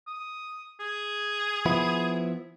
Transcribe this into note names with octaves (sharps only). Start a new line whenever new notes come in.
D#6
G#4
F3 B3 E4